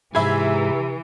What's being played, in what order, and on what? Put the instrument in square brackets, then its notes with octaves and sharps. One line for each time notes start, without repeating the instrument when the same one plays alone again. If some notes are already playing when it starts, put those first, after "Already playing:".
[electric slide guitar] G#2 G#4 [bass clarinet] C3 [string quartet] E3 [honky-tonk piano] E5 B5 G#6